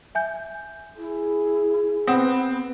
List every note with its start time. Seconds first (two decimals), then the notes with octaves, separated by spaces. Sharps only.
0.15 E5 G#5 G6
0.97 E4 G#4
2.07 B3 C4 F#5 D#6